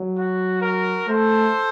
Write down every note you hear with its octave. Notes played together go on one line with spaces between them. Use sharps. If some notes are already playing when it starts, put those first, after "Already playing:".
Already playing: F#3
F#4
F#4 A#4
A3 A4 C5